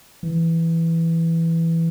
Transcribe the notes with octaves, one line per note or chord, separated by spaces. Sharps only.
E3